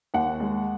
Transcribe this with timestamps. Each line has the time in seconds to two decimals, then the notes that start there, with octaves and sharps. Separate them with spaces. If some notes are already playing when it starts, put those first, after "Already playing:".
0.14 D#2 F#5
0.40 G#3